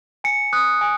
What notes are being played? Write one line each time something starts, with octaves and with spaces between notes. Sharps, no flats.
G#5 C#7
D#6 F#6
G#5